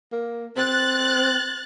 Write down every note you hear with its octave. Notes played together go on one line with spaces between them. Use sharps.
A#3
C4 F#6 A6